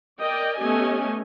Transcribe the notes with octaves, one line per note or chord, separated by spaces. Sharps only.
A#4 D5 D#5 G5
A3 B3 C#4 G4 D#5 G#5